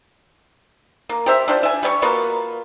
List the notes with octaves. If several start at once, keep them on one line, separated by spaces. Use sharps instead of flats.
A#3
G4 C5 E5
D4 F4 G4 C5
E5 G#5
G3 C#5 C#6
A#3 B3 F4 F#4